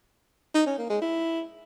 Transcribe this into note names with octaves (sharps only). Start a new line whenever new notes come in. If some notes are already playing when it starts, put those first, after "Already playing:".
D#4
C#4
A#3
G#3
E4